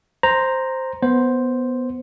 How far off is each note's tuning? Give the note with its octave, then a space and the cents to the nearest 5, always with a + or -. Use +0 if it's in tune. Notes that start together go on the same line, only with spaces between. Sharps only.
C5 +0 A#5 +0
B3 +0 C5 +0